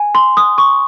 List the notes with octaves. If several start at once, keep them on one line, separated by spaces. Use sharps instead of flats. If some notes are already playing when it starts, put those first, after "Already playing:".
Already playing: G#5
C6
D#6
C#6